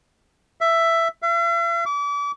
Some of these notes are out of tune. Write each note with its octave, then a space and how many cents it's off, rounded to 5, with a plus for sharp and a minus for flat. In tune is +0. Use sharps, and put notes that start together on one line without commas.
E5 +10
E5 +45
D6 -35